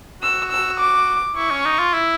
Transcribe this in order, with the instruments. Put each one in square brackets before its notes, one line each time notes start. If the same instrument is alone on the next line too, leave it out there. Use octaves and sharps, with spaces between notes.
[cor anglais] F#4 [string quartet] E6
[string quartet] E6
D6
[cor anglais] E4 [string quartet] C#6
[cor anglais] C#4
D#4
F4
E4